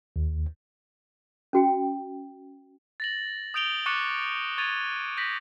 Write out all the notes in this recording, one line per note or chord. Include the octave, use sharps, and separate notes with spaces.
D#2
C#4 F#4 G5
A6 A#6 F#7
D#6 G6 D7 F7 G7
C#6 D6 F#6 A6 C#7
C#6 G#6 A6 D#7 F7
G6 A#6 B6 F#7